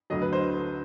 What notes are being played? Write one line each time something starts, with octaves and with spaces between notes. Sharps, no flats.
D2 D3 F#3 D#5
B4
C5